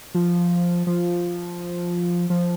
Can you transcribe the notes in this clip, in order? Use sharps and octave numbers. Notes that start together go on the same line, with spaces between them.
F3
F3
F3